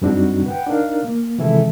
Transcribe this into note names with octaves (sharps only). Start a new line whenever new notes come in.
F#2 G3 C4 D4 D#4 F#4
B4 F#5 G5
D4 D#4 A#4 F5
A#3
C3 D#3 E3 G#3 E4 A4